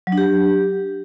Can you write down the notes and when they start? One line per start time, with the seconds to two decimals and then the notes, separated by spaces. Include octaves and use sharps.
0.07 F#3
0.12 D4
0.18 G4